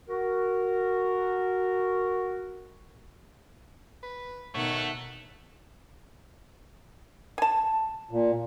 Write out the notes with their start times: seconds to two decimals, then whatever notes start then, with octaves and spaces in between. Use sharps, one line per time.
0.08 F#4 A#4
4.03 B4
4.54 B2 D#3 A3 C#5 F#5
7.38 G#5 A5
8.11 A#2